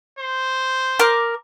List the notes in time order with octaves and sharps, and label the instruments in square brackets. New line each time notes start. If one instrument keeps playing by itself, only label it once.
[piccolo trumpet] C5
[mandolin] A#4 D6